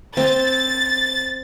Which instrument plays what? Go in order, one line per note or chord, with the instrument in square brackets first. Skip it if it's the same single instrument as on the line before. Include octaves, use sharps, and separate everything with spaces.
[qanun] C4 [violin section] A6